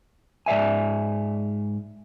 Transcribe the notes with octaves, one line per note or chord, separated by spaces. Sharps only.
G#2 D5 E5 G#5